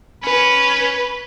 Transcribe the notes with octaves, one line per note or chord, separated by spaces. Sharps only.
C#4 B4